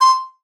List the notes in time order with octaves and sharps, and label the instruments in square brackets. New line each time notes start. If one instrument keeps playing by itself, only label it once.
[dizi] C6